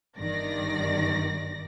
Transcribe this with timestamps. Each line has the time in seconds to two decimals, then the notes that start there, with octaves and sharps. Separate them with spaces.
0.17 G1 G2 D#3 D5 A#6